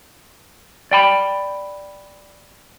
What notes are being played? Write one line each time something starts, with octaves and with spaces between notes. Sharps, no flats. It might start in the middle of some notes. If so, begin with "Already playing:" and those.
D5 G5 B5